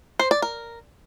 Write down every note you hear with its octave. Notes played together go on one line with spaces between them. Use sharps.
C5
D5
A#4